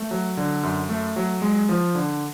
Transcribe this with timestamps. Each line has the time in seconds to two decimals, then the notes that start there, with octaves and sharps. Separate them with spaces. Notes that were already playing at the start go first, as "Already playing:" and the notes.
Already playing: A3
0.11 F#3
0.37 D3
0.63 F#2
0.89 A3
1.16 F#3
1.42 G#3
1.69 F3
1.95 D3